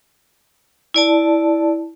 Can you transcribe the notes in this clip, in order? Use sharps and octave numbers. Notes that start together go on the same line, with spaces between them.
E4 D5 A5